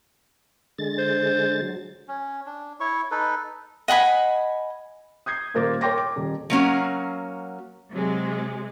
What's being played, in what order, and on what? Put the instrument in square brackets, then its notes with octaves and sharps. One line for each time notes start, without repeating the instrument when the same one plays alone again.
[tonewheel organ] D3 G#3 A6
[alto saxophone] C5
[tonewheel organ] F#3
[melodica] C#4
D4
E4 C#5 C#6
D#4 A4 B4
[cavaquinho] D#5 F#5 G#5 B5
[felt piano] D#6 G6 G#6 C7
D#1 A#2 A#4 C5 D6 A6
A#4 C#5 G5 C6 D6 A#6
D6
D#1
[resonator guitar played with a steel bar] F#3 A#3 C#4 F#4
[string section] C3 F#3 G#3